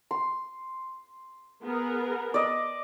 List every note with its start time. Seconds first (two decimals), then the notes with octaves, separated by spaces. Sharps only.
0.11 C6
1.62 B3 G#4 A#4
2.34 D5 D#5